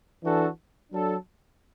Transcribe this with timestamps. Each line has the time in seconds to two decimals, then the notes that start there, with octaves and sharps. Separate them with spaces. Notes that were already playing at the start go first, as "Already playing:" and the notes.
0.23 E3 D4 F#4 A4
0.93 F#3 D4 A4